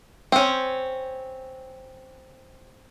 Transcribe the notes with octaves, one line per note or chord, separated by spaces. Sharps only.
C4 C#4